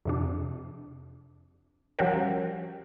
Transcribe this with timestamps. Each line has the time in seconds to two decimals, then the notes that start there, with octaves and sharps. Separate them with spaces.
0.05 F2 C3 D4
1.99 F3 G3 C#4 F#4 G4 A#4